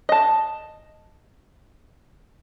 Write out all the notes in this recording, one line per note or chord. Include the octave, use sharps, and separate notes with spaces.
D#5 A5